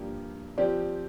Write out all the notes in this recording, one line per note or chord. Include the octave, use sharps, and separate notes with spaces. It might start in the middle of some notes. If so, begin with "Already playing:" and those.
Already playing: G2 F3 A#3 G4
F3 C4 G4 D5